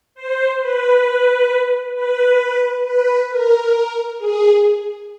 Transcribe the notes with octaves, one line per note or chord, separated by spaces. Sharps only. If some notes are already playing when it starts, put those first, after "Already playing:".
C5
B4
B4
B4
A#4
G#4